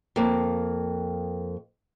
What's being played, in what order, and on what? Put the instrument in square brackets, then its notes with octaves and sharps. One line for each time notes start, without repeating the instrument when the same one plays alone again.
[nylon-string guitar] F2 A#3